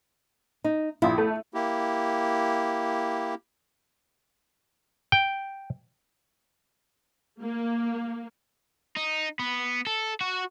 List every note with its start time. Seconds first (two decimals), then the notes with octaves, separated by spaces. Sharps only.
0.64 D#4
1.02 A#1 E4 F4
1.18 A3
1.54 A#3 E4 G4
5.12 G5
7.41 A#3
8.97 D#4
9.39 B3
9.87 A4
10.21 F#4